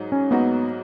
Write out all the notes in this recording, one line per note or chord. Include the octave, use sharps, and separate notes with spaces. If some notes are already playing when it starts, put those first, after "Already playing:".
Already playing: G#2 F#3 D#4
C#4
G#2 F#3 A#3 B3 D#4 F#4